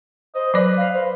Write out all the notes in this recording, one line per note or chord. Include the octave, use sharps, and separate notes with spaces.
C5 D#5
F#3 B4 D5
F5
C5